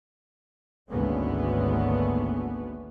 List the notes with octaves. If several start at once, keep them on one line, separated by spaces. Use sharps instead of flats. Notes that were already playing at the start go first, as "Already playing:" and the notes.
G#1 D2 G#2 A#3 B3 C#4